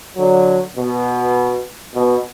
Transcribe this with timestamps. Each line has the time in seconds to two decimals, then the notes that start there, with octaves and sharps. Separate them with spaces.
0.17 D3 F#3
0.76 B2
1.95 B2